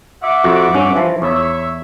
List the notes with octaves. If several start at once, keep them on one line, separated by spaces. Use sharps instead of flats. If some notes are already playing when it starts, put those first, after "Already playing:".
E5 F#5 D6
F2 F#4
G2 C#4
E3 F3
E2 C#5 E5